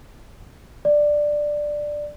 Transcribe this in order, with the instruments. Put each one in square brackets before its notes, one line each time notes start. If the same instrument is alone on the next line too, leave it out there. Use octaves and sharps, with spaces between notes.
[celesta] D5